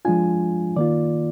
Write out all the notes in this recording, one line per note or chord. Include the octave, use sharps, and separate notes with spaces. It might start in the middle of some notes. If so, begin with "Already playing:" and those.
F3 G#3 D4 F4 G#5
D#3 A#3 F4 D5